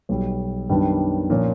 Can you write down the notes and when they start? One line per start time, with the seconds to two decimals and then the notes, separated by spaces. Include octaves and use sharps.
0.09 B1 B2 G3
0.69 F#2 D#3 G3 B3 D4
1.30 A#2 F3 A#3 C#4